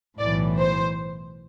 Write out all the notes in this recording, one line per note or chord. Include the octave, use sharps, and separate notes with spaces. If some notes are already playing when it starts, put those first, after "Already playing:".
B1 A2 E3 D5
C5